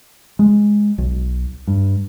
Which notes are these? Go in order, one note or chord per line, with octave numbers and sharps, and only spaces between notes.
G#3
B1
G2